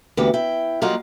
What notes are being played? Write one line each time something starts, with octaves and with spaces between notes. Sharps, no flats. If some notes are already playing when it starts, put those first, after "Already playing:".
D2 E3 B3 G4
E4 G5
F#3 G3 A#3 F4 D#5 F#5